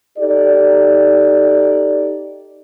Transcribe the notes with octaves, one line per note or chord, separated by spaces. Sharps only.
D#4 G4 A4 D5